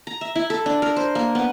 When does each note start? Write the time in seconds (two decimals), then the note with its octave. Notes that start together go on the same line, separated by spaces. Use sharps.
0.07 A#5
0.21 E5
0.36 E4
0.50 A4
0.66 D4
0.82 A#4
0.96 C5
1.15 A#3
1.35 B3